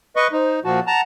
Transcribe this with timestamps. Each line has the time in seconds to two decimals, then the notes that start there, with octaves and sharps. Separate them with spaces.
0.16 B4 D#5 C#6
0.32 D#4 C5
0.65 A#2 F3 F#4 A5
0.87 F#5 A5 A#5